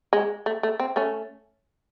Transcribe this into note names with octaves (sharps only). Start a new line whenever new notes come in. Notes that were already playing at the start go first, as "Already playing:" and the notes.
G#3
A3
A3
C4
A3 C#4